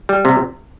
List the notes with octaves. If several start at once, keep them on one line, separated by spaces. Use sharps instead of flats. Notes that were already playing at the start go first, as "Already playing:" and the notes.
G3
C3